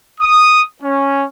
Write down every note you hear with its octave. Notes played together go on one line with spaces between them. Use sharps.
D#6
C#4